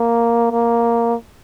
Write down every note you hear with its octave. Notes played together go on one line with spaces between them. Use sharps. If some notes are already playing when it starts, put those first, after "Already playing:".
Already playing: A#3
A#3